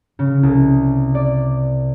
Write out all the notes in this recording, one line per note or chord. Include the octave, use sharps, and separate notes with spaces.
C#3
C2
D5